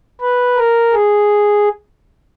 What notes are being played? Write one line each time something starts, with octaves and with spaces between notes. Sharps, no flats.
B4
A#4
G#4